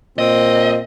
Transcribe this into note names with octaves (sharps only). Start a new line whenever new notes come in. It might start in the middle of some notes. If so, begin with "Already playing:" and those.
A#2 C4 D#5